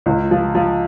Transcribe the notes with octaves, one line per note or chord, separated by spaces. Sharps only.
C#2
F3
F3